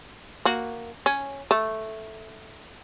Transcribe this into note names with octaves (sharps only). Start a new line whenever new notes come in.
A#3 F#4
C#4
A3